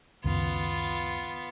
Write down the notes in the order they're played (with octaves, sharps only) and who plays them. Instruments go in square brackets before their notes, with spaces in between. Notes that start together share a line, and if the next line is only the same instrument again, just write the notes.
[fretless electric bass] C#2 F#2 D#3 [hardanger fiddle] B3 F4